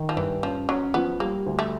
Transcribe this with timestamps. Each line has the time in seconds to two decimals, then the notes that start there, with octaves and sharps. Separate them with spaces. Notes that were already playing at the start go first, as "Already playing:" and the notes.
Already playing: D#3
0.09 F3
0.16 G2 E3
0.43 F3 C#4
0.69 F#3 C#4
0.94 F3 B3
1.20 G3 A#3
1.46 D2
1.59 A3